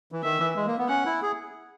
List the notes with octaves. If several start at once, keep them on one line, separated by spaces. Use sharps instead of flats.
E3
D#3 E5
E3
G#3
A#3
B3
C#4 F#5
E4
G#4